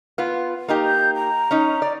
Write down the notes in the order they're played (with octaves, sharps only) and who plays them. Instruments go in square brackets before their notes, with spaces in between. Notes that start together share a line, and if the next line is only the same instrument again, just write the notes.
[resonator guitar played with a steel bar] B3 F4
A#3 D#4 G4
[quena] G6
A#5
[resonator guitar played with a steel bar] C#4 D#4
D5